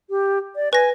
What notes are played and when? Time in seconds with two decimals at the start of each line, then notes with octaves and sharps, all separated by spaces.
0.10 G4
0.56 D5
0.73 B4 G#5 A#6